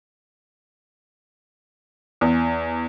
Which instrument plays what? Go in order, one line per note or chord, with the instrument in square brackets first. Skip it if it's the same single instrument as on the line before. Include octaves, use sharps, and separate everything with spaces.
[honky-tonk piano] E2